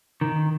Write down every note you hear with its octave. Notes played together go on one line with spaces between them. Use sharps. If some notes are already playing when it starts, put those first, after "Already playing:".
D#3